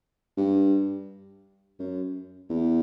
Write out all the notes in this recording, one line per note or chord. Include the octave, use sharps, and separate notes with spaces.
G2
F#2
E2